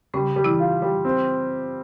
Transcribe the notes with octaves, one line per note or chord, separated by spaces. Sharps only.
C#3 G3 C#4
G3
E3 E4
F4
G3
C4